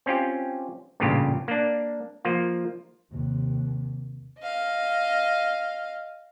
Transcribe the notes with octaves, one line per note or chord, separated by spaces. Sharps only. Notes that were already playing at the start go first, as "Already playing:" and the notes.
C4 C#4 F4 G4
A1 G2 A#2 C#3 F4 G4
A#3 D4
F3 A#3 F4
D#2 C3
D#5 F5